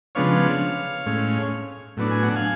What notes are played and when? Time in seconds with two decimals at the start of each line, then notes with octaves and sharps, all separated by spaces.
0.15 C#3 F3 G#3 B3 D4 C#5 F5
1.06 A2 G#3 C#4
1.97 A2 F#3 B3 D4
2.11 G#5
2.23 F#5
2.35 F5 G#5